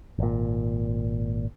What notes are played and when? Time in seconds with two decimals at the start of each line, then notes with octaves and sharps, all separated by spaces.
0.19 G#1 A#2